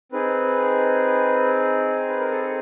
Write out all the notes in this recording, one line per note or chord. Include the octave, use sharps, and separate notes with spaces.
C4 D#4 G#4 B4
B4
A#4
A4